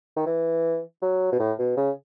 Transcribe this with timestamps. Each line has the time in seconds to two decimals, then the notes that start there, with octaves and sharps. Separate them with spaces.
0.16 D#3
0.26 E3
1.02 F#3
1.32 B2
1.39 A2
1.59 B2
1.77 C#3